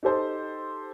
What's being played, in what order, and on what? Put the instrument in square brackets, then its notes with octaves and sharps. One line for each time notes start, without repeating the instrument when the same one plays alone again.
[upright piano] D#4 G4 A4 C5